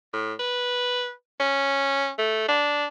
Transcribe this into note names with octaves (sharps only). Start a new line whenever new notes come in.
A2
B4
C#4
A3
D4